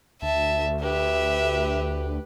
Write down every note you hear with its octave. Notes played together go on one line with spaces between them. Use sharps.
D2 E5 A5
G4 B4 E5